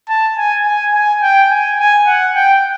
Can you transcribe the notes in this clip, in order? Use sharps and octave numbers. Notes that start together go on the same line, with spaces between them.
A5
G#5
G#5
G#5
G5
G#5
G#5
F#5
G5